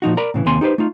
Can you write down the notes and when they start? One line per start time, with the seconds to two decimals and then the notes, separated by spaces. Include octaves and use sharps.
0.02 A#2 F3 D#4 F#4
0.17 A#4 D5 A#5 B5
0.34 A2 C#3 E3
0.46 D#2 C3 A#3 C4 G#5 C6
0.61 D#4 G4 A4 B4 C5
0.78 A3 D#4 F4